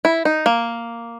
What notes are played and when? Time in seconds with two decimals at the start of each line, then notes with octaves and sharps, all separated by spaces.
0.05 E4
0.25 D#4
0.46 A#3